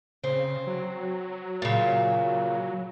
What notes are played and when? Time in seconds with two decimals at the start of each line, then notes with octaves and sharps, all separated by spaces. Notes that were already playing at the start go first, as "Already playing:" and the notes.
0.24 C#3 C4
0.67 F#3
1.62 A#2 C#3